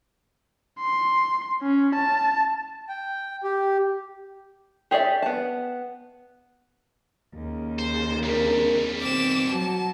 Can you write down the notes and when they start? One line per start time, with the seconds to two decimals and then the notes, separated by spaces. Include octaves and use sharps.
0.80 C6
1.62 C#4
1.95 A5
2.89 G5
3.44 G4
4.91 G4 G#4 C#5 D5 E5
5.22 B3 A5
7.34 D#2 C#3
7.79 C5
8.23 F2 G3 C4 D4 A#4
9.00 B2 D#3 C4 D6 E7
9.52 F#3 F#4 A5